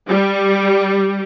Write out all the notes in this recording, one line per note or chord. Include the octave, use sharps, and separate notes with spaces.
G3